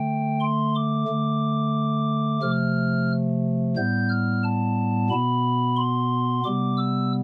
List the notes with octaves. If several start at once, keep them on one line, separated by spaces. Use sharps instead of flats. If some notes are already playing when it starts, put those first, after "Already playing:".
Already playing: D3 A3 G5
C6
D6
D3 A3
C3 F3 A3 F6
A2 G3 B3 G6
F6
A5
B2 B3 B5
C6
C3 G3 B3 D6
E6